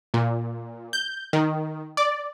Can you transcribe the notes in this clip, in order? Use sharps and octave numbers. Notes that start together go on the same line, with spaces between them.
A#2
G6
D#3
D5